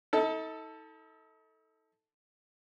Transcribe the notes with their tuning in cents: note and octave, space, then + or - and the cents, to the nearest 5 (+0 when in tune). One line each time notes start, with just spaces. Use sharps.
D#4 +45 A4 +5